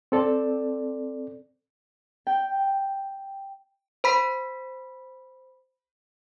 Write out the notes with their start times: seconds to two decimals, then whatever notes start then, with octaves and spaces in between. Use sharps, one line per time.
0.12 C4 A4 D5
2.27 G5
4.04 C5 B5 B6